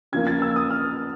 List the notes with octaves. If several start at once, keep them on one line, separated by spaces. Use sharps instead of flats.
C#3 F3 A#3 G#6
A6
E6
D#6
F6